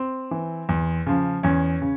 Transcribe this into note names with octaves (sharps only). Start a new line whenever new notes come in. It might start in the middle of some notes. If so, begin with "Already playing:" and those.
Already playing: C4
E3
E2
C#3 F3
E2 C#4
C#3